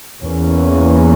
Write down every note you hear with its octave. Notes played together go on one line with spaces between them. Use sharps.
E2 E3 A#3 C#4